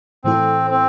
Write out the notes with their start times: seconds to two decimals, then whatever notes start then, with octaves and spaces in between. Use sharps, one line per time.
0.24 A2 E3 A3 C4 E4 A4
0.71 C4